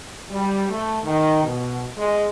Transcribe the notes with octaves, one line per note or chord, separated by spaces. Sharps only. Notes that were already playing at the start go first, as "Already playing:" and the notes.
G3
A3
D#3
B2
G#3